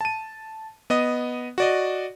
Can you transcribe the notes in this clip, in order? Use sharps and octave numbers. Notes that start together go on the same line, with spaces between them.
A5 D#7
B3 D#5 D#6
F#4 D5 D#5